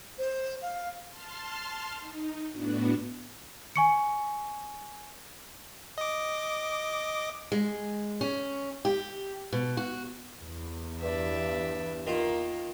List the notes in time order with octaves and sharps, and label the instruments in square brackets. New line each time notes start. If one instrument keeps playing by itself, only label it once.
[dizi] C5
F5
[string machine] A5 C6 F6
D#4
A2 B3 D4 F#4
[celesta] G#5 C#6 C#7
[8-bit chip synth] D#5 D6
[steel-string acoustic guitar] G#3
C#4
G4
B2
F#4
[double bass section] E2
[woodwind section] G2 [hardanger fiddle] D5 E5
[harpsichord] D#3 F4 [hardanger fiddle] A#3